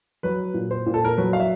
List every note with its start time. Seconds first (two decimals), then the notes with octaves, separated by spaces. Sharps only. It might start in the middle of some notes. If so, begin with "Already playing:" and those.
0.23 F#3 B4
0.54 A#2
0.71 C5
0.86 A#2
0.94 A4
1.05 A#4
1.17 F#3 B4
1.33 F5
1.40 E5